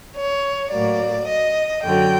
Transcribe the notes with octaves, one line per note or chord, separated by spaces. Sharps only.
C#5
A2 F#3 A#3 D5
D#5
F#2 D3 F#3 G5